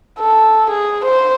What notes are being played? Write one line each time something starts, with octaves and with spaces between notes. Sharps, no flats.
A4
G#4
C5